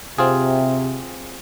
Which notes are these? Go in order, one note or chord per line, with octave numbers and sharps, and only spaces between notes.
C3 C4 F4 G#4